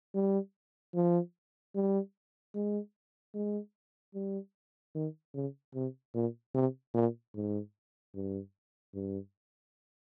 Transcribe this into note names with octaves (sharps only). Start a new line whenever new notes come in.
G3
F3
G3
G#3
G#3
G3
D#3
C#3
C3
A#2
C3
A#2
G#2
G2
G2